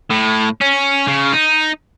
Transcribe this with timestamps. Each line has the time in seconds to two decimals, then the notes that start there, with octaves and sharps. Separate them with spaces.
0.10 A2
0.61 C#4
1.08 C#3
1.33 D#4